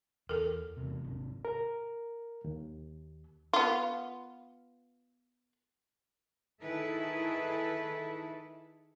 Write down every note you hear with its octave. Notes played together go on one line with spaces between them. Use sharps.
E2 A4 A#4
E2 C3
G#1 C3
A#4
D#2
B3 F4
D#3 E4 G#4 A4 B4 E5